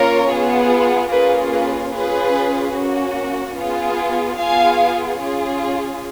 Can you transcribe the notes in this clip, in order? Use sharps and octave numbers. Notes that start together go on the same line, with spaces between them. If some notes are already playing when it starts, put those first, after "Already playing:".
Already playing: A#3 C#4 F4 A#4 C#5
B3 F4 G#4
A#3 C#4 F4 G#4 B4
B4
C#4 F4 G#4 B4
A#3 C#4 F#4
B3 F4 G#4
B3 F4 G#4 F5 G#5
C#4 F4 G#4